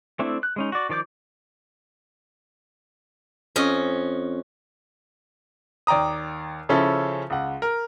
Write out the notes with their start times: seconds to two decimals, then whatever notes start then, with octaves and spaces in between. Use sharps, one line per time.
0.19 A3 C4 D4 E4
0.43 F#6
0.56 G#3 C#4 D#4
0.72 F#4 D5
0.89 D#3 F3 D5 D6 G6
3.56 F2 C#4 D#5
5.87 D#2 D5 G5 A#5 D#6
6.69 C#3 F3 C#4 E4 A4
7.30 C#2 F#5
7.62 A#4